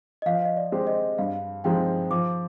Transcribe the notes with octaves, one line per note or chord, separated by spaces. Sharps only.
D#5
F3 F5
D#5
D5
G#3 C4 G4 C5
D#5
G2 F5
F3 G#3 C4 D#4 G5
F3 D6